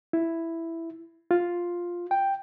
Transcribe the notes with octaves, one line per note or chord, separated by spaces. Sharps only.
E4
F4
G5